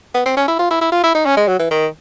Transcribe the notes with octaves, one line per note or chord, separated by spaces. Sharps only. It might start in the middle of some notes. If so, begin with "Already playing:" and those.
B3
C4
C#4
E4
F4
E4
E4
F4
E4
D#4
C#4
G#3
F#3
E3
D#3